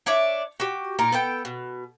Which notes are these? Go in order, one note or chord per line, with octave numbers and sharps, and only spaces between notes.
D4 C#5 D5 E5
F#4 G4
A#2 D#4 A#4 A#5
B3 A4 G5
B2